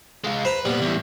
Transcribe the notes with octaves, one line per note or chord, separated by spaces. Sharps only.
G#3 F4
B4 C5 A#5
A#2 G3 B3
E2 A2